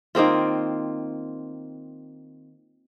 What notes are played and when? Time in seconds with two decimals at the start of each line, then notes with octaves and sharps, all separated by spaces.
0.15 D#3 A#3 C4 F4